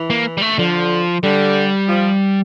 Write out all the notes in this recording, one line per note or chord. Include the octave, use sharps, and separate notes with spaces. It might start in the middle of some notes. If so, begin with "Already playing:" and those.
Already playing: E3
A#3
G3
A3
D3 F3
D3 G3
F3